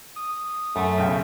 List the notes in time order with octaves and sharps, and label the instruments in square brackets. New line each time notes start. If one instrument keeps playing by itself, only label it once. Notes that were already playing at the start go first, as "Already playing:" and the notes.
[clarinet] D#6
[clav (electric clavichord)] F#2 [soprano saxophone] A3
[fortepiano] B1 C#3 G5